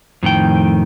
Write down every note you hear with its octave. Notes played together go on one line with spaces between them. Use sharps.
F2 A2 D#3 G5